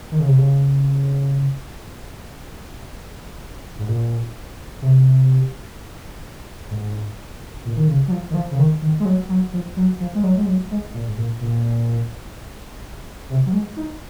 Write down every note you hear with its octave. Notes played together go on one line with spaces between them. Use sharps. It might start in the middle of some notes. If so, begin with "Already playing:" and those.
D#3
C#3
C3
C#3
G#2
A#2
C3
G#2
A#2
D#3
C#3
F#3
F3
D#3
F3
C#3
D#3
D#3
G#3
F#3
F#3
F3
F#3
F3
G#3
F#3
G#3
F#3
G#3
A#2
G#2
A#2
A#2
C3
F#3
G#3
D#4